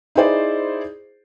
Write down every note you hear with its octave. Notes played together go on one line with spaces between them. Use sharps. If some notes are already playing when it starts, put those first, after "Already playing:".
D#4 E4 G#4 C5 D5